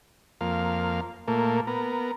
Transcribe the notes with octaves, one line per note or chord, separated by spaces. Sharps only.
F2 A#3 F5
A#2 A3 A#3
B3 A#4